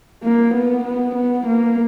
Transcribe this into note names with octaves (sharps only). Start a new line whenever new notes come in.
A#3
B3
B3
B3
A#3